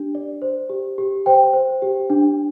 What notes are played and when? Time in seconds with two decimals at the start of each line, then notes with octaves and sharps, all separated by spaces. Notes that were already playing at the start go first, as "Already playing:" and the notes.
Already playing: D4 G4
0.15 D5
0.42 C5
0.70 G4
0.98 G4
1.26 C5 G5
1.53 C5
1.82 G4
2.10 D4